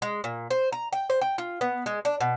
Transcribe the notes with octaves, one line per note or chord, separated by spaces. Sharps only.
G#3
A#2
C5
A#5
G5
C5
G5
F4
B3
G#3
D4
B2